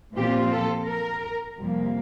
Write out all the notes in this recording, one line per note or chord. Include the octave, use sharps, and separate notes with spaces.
A#2 F3 C4 F4 G4
A4
A#4
F2 C3 G3 A#3